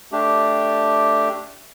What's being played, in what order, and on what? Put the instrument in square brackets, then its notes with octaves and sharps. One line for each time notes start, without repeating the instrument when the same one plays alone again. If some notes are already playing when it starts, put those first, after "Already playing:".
[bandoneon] A3 D4 G4